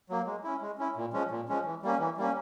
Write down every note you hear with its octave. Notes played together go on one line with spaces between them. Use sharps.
F#3 A#3
G#3
C#4 E4
G#3
C#4 E4
A#2
F3 G#3 C#4
A#2
F3 G#3 C#4
E3
G3 A#3 C#4
E3
G3 A#3 C#4